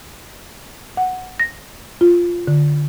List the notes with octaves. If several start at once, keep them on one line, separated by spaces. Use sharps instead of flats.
F#5
A#6
F4
D3